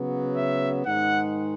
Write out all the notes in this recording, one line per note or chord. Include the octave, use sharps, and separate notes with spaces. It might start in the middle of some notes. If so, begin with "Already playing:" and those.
Already playing: C#3 F#3 B3
E5
G#2 D#3 G#3 D#4 F#5